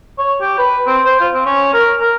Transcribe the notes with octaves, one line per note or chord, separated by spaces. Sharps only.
C#5
G4
B4
C4
C5
F4
C4
C#4
A#4
A#4